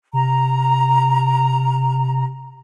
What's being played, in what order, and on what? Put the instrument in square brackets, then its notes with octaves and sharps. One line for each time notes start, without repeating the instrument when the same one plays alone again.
[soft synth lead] C3 [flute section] A#5